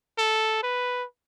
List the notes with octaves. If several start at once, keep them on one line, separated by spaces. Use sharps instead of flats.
A4
B4